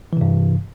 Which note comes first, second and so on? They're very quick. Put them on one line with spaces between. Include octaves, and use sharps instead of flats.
E3 C3 G2